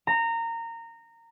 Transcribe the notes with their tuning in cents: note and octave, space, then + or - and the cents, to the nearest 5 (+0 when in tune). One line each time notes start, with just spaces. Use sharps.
A#5 -20